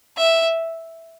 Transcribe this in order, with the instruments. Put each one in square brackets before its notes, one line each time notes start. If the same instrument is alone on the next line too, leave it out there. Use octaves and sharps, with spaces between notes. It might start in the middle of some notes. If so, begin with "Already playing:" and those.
[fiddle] E5